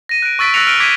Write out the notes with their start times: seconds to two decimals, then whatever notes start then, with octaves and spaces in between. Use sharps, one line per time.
0.09 A#6 D#7
0.22 F#6 D7
0.39 C#6 E6 A6 B6 D7
0.54 E6 F#6 A6 A#6 C#7 F7
0.67 F6 D7 G7
0.80 C#6 D6 G#6 B6 D7